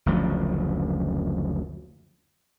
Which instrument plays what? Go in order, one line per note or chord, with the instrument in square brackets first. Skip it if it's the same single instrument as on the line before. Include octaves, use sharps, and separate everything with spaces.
[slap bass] F#1 D2 C#3 F3